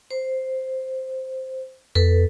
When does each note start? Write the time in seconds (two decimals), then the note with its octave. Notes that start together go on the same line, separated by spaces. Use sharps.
0.11 C5
1.95 F2 A4 B4